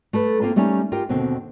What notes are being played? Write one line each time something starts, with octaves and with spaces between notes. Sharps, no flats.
A3 A4 B4
A#3 C4 F4 A4
G3 A3 A#3 C#4 D#4
F4 G4 A#4 G5
D#2 B2 D3 C4